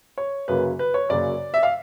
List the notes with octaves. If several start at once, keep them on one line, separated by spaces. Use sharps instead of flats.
C#5
F#2 C#3 F#3 A#3 B4
B4
C#5
F#2 C#3 F#3 A#3 D5
E5
F5